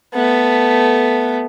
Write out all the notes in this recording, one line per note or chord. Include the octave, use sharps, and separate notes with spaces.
A3 B3